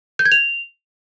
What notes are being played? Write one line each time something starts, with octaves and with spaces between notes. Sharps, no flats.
G6
G#6
F7